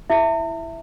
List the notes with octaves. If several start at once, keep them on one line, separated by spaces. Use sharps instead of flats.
E4 E5